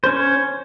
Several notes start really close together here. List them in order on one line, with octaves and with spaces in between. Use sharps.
C5 C#4 C#5